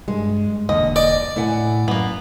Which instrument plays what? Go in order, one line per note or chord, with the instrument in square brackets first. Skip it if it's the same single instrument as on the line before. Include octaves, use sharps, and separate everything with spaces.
[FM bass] G2 [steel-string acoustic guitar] G#3
[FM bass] E1 [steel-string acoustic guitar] A#2 D3 [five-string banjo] D#5
[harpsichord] D5 [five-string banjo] D#5
[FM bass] A2 [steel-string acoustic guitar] E4 F#5 G#5
[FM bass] F#2 [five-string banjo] A#3 B3